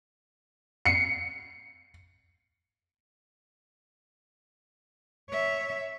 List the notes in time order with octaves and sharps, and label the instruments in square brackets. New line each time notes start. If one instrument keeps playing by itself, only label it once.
[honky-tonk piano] C7 C#7
[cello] C#5 E5